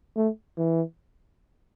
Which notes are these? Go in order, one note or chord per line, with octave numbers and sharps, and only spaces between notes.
A3
E3